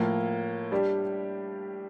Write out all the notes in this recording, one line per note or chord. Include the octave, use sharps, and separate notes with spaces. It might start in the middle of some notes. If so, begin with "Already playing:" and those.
Already playing: A2 F3 A#3
G3 D4 G4